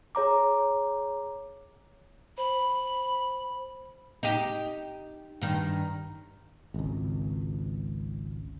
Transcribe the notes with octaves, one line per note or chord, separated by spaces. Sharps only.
G#4 C#5 A#5 D6
C5 B5
D#4 G4
G2 D#3
G#1 C#2